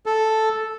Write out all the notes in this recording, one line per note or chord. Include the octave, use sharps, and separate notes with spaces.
A4